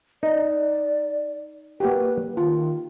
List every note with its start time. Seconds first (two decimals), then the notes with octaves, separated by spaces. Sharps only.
0.23 D#4 D5
1.80 A#3 F#4 G4 B4
2.37 D#3 F4